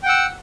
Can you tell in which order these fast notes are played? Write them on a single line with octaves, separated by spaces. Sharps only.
G5 F#5 E6